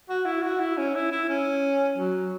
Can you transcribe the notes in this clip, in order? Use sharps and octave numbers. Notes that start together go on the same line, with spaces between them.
F#4
E4
F#4
E4
C#4
E4
E4
C#4
F#3